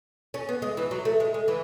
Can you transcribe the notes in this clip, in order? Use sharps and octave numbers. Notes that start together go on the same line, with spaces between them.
C#4
B3
G#3
E3
F#3
A3
G#3
G#3
E3